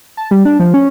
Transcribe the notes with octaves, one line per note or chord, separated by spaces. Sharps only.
A5
G3
D4
F3
C#4